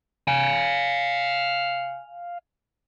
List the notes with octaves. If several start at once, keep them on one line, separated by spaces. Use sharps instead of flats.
F5 G#5